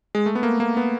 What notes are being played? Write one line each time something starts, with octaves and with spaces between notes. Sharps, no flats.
G#3
A3
B3
A#3
A#3
B3